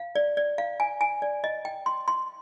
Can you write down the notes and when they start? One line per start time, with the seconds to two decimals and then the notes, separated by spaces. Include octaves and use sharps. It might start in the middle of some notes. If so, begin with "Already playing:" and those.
Already playing: F5
0.15 D5
0.37 D5
0.58 F5
0.80 G#5
1.01 G#5
1.22 D5
1.44 D#5
1.65 G5
1.86 C6
2.08 C6